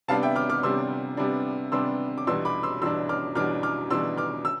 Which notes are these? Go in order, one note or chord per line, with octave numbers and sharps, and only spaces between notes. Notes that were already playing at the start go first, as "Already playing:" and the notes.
C3 G3 B3 D4 F5 A5
E5 G5
D6 F6
D6 F6
C3 G3 B3 D4 C6 E6
C3 G3 B3 D4
C3 G3 B3 D4 C6 E6
D6
E2 B2 G3 D4 C6 E6
B5 D6
C6 E6
E2 B2 G3 D4 C6 E6
D6 F6
E2 B2 G3 D4 D6 F6
D6 F6
E2 B2 G3 D4 C6 E6
D6 F6
E6